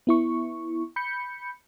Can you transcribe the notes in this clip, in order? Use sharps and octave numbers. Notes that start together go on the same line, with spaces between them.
B3 E4 C#6
B5 G6 C#7